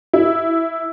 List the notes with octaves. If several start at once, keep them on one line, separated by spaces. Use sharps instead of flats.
E4